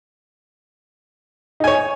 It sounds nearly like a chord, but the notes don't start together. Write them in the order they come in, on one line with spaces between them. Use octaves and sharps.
D#4 G#5 C#5